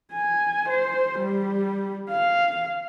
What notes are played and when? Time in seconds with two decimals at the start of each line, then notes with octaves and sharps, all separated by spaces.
0.13 G#5
0.69 C5
1.19 G3
2.10 F5